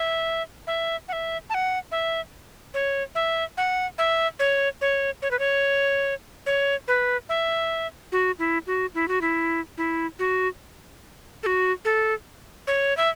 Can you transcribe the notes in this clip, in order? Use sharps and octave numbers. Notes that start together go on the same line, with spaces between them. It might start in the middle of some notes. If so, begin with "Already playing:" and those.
Already playing: E5
E5
F#5
E5
A5
F#5
E5
C#5
E5
F#5
E5
C#5
C#5
C#5
B4
C#5
C#5
B4
E5
F#4
E4
F#4
E4
F#4
E4
E4
F#4
A4
F#4
A4
C#5
E5